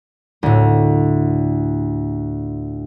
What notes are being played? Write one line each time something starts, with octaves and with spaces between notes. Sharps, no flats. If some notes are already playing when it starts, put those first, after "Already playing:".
D2 A2